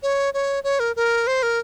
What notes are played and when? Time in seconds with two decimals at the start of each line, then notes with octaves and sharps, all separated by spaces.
0.03 C#5
0.34 C#5
0.64 C#5
0.80 A#4
0.96 A#4
1.27 C5
1.43 A#4